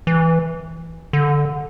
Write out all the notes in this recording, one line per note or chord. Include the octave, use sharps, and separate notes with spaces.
E3
D3